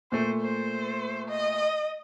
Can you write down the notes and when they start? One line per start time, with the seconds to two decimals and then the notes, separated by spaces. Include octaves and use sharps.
0.12 A#2 A3 C5
0.41 C5
1.29 D#5